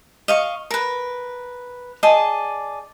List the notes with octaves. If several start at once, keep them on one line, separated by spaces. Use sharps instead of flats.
D#5 F5 C#6
A#4 B4
G#4 D5 D#5 A5